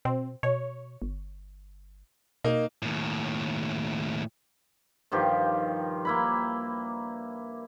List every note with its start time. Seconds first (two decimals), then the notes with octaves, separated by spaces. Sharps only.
0.05 B2 C4
0.43 B2 C#5
1.02 G1
2.44 B2 A#3 D#4
2.82 D#2 A2
5.11 G2 D#3 F3 G4
6.05 A#3 E4 B5